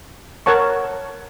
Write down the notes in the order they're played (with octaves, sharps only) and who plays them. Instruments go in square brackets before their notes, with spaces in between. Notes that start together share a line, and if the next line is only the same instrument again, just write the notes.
[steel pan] A#4 C#5 F#5 A5 C#6